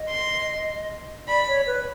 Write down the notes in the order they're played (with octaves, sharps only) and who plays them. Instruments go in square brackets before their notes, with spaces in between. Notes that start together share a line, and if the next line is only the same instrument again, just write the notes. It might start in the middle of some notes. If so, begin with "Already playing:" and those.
Already playing: [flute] D#5
[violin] C6
[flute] D5 [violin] B5
[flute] C#5
B4